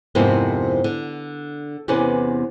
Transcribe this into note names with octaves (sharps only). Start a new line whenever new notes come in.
F2 G#2 C3 A#3 B3 E4
D3
E2 C3 C#4 B4 D5